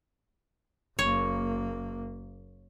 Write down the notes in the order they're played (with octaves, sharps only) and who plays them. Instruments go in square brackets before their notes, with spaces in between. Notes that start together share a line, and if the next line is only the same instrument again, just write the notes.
[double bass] F#1 A#3 [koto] C#5